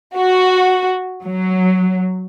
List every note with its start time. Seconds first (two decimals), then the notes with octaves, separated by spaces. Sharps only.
0.15 F#4
1.24 F#3